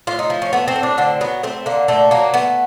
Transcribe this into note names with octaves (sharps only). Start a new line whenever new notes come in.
A2 F4
D#4
F3
C#4
A3 B3
C4
A2
D4
D3 C4
F#3 B3
A3 C4
D3 A#3
A#2 A3
F#3 A#3
A3 B3